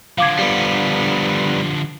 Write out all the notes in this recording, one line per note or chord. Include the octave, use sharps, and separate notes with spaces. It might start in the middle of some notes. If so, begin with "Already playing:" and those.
D3 F3 F5 D6 G#6
G3 B3